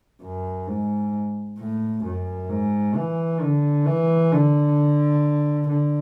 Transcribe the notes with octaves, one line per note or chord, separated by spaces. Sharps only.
F#2
G#2
A2
F#2
G#2
E3
D3
E3
D3
D3